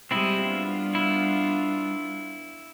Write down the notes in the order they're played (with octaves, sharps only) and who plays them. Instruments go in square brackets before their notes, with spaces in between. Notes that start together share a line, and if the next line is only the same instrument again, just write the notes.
[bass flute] G3 [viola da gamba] G#3 G4 G#4 [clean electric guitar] C4 E4
[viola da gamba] B3 D4 F4
[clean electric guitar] E4